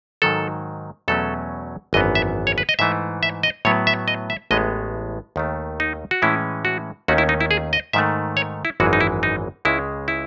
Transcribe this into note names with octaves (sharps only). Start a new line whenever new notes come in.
G#2 D#3 F#3 A4
E2 B2 F#3 A3 C#4 A4
G#1 F#2 E3 B3 D#5
E5
C#5
B4
D#5
G#2 E3 A3 E5
E5
D#5
A2 F#3 B3 C#5
E5
D#5
E5
A1 A2 G#3 B3 D#5
D#2 D#3 A3
D#4
F#4
A2 E3 G#3 C#4 E4
F#4
D#2 D#3 A3 C#4 F#4
E4
D#4
E4
G#4
D#5
G#2 D#3 A3 E5
C#5
E4
G#1 F#2 E3 G#3 F#4
D#4
E4
D#4
C#2 C#3 G#3 E4
E4